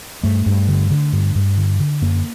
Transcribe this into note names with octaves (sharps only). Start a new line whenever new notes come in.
G2 A3
G2
D3
D3
G2
G2
D3
D3
F#2 A#3